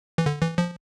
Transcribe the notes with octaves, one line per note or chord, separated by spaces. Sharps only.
E3
D3
E3
F3